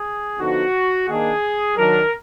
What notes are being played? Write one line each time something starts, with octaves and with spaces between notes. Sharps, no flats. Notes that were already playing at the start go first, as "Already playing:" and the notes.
Already playing: G#4
D3 F3 B3 D#4 F#4
D#3 A#3 D4 G#4
D#3 F#3 D4 A#4